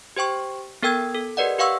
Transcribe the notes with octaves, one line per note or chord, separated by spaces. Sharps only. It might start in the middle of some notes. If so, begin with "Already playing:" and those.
G4 C5 G5 C#6
B3 A4 A#4 G5 E6 G#6
A4
G4 A#4 B4 D5 D#5 F#5
G4 B4 F5 F#5 C#6 E6